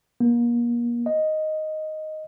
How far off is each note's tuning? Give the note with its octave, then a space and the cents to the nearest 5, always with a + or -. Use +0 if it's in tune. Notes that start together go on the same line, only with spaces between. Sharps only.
A#3 +35
D#5 +0